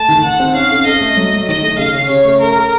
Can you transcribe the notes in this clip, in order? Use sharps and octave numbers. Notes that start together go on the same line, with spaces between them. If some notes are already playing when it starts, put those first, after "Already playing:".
Already playing: A3 A5
D#3
D#3 F#5
C4
C#4 F5
A4
A4 D#5
A3
F#3
F#3
D#3 D#5
A3
C#3 F5
C#4
C#3 C#5
A3
A4 A#4
A4